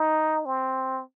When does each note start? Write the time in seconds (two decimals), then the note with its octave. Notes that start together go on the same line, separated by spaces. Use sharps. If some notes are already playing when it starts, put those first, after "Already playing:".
Already playing: D#4
0.46 C4